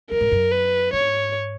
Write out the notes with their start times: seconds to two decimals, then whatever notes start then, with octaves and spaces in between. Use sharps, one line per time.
0.11 F#2 A#4
0.21 G#2
0.32 F#2
0.52 B4
0.93 G#2 C#5